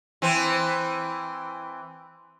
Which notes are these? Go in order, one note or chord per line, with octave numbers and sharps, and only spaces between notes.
E3 C4